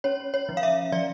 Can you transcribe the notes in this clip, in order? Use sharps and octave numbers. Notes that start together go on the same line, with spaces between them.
C#4 C#5
C#5
F3
F5
E5
F3 D5